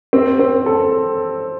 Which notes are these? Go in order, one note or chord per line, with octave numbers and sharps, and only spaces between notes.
C4
C4
A4